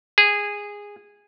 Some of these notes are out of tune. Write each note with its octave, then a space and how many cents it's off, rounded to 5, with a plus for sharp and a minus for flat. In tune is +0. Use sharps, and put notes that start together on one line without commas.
G#4 -15